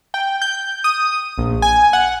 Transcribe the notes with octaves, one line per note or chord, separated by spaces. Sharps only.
G5
G6
D#6
A#1
G#5
F#5